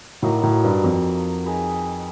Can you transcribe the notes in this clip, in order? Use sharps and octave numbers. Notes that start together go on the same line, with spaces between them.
A2 F#3 A#3 D#4
A2
G2
F2
D#4 G#4 B4